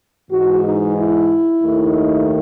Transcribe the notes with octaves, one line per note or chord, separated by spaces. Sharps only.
G#2 E3 G#3 F#4
D#4
E4
D#2 D#3 A3 D#4